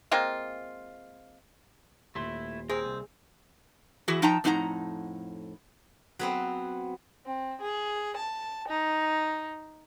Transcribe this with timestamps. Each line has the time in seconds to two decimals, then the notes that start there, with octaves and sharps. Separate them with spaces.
0.11 G#3 A#3 C4 F4
2.15 D#1 A3 E4 C6 G7
2.70 C4 G#4 A#4
2.85 C2
4.08 E3 E4 F#4 G#4
4.22 F3 D#4 G5 A5 A#5
4.44 F2 A2 D#4 F#4 F#5 A#5
6.19 F#3 B3 C4
7.25 C4
7.60 G#4
8.17 A5
8.67 D#4